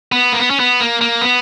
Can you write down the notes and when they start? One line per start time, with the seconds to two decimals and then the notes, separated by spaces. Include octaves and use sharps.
0.12 B3
0.33 A#3
0.39 B3
0.50 C#4
0.60 B3
0.81 A#3
1.01 A#3
1.22 B3